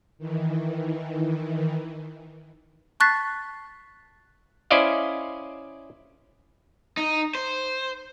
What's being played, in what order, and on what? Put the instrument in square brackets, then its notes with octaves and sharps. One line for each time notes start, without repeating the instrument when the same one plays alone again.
[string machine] D#3 E3
[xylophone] A5 C#6 F#6 A6 B6 C7
[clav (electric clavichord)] C#4 E4 C5 D5 D#5 F5
[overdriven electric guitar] D#4
C5